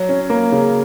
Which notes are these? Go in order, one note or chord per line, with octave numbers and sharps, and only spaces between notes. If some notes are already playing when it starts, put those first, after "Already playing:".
Already playing: F#3
C#4
A#3
C#3